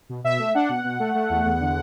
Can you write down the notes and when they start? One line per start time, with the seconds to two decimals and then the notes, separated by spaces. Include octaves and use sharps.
0.09 B2
0.24 B2 E5
0.39 A3
0.54 D4 F#5
0.69 B2
0.84 B2
1.00 A3
1.15 A3
1.30 E2
1.45 E2
1.60 D3